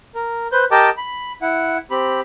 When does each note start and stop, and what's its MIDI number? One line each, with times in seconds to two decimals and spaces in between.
0.15 0.48 70
0.52 0.65 71
0.52 0.65 72
0.52 0.65 91
0.71 0.90 67
0.71 0.90 70
0.71 0.90 75
0.71 0.90 79
0.71 0.90 81
0.71 0.90 86
0.97 1.32 83
1.42 1.77 64
1.42 1.77 78
1.91 2.21 60
1.91 2.21 67
1.91 2.21 83